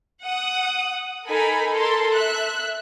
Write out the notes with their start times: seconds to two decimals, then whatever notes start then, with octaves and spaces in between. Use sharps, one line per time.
0.22 F#5 D#6
1.27 D#4 A4 A#4 G#5 B5
1.71 A4 A#4 C6
2.14 E5 F#6